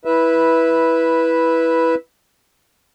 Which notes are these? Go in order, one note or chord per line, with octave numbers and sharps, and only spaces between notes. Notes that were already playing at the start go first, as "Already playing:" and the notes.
E4 B4 E5